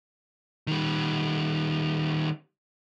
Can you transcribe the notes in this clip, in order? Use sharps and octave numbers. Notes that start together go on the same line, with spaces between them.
D#3 G3